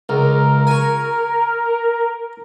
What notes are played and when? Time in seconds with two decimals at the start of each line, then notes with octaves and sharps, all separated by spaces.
0.09 C#2 A#4
0.67 G#5 C#6